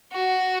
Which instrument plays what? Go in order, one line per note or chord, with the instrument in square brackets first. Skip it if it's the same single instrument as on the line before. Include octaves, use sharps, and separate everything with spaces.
[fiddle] F#4